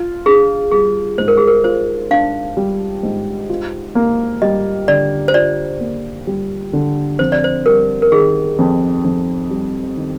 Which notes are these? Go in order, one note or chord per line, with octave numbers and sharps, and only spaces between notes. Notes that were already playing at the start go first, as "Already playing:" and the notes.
Already playing: F4
D4 G#4
G3 G#4
G#2 C5
A#4
G#4
A#4
F4 C5
D4 F5
G3
G#2
F4
A#3
G3 D#5
D3 D5
C5
F4 D5
A#3
G3
D3
F2 C5
D5
C5
G3 A#4
A#4
D#3 G#4
F2
F2
G3
D#3